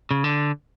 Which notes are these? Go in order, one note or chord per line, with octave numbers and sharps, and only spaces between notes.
C#3
D3